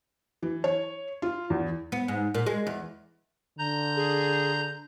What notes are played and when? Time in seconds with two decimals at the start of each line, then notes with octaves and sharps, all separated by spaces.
0.43 E3
0.64 C#5
1.22 F4
1.50 E2
1.92 B3
2.08 G#2
2.34 A#2
2.46 G#3
2.67 E2
3.59 D3 A#5 G6
3.96 G#4